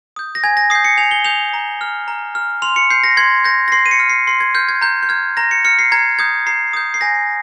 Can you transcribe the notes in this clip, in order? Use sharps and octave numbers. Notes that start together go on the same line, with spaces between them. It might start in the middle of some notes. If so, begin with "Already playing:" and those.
D#6 G6
A#6
G#5 G#6
A#6
D#6 G6 C7
C#7
G#5 F7
G7
D#6 G6 F7
A#5
F6
A#5
F6
C6 F7
C#7
G6 C7
A#6
C6 G#6
G6 A#6
A#6
C6 C7
D#7
C#7
F6
C7
C6 C7
G#6
F6 G6
G#6
A#5 G6
G6
F6 G#6
A#5 A#6
C#7
F6 C#7
C7
A#5 G#6
D#6 G6 G#6
A#5 C7
D#6 G6
C7
G#5 A#6